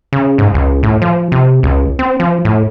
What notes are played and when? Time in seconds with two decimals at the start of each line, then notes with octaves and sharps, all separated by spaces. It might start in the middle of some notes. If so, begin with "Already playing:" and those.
0.13 C#3
0.38 G#2
0.54 C#2
0.83 A2
1.02 F3
1.32 C3
1.63 C#2
1.99 C4
2.20 F3
2.45 A2